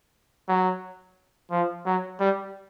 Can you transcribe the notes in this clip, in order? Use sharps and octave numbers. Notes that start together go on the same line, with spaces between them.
F#3
F3
F#3
G3